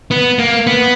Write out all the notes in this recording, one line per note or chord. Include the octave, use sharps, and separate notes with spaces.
B3
A#3
B3